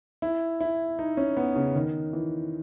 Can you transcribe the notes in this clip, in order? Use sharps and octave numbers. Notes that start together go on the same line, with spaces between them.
E4
E4
D#4
C#4
B3
C#3
D#3
E3